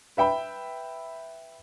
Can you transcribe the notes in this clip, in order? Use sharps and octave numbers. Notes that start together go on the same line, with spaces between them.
B4 E5 G5 B5